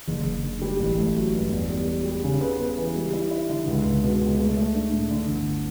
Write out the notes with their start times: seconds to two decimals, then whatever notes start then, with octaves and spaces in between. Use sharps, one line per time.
0.08 F#1
0.25 F#1
0.43 D3
0.62 G3
0.80 A1
0.98 A3
1.15 F#3
1.33 G2
1.52 E2
1.70 G3
1.88 G3
2.05 G3
2.24 C#3
2.41 B3
2.59 B3
2.78 E3
2.95 G3
3.13 E4
3.31 E4
3.49 D3
3.67 C#2
3.85 C#2
4.03 B2
4.21 C#2
4.39 A3
4.57 A3
4.75 D4
4.93 A2
5.11 D3
5.29 G1